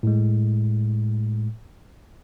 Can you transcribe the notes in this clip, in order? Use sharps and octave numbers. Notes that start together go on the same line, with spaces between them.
A2 G#3